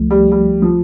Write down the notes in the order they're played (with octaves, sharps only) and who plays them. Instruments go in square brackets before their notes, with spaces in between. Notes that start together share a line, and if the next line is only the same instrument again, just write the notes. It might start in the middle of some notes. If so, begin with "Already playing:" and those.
Already playing: [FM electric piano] C#2 F3 A3
[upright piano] G3
G3
F3